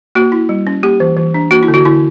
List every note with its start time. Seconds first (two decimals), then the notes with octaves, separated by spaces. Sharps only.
0.15 A#3 F#4
0.32 E4
0.49 G3
0.67 C#4
0.83 A#3 G4
1.00 E3
1.17 E3
1.34 D4
1.51 A#3 F#4
1.63 E4
1.68 D3
1.74 F#4
1.85 D3 E4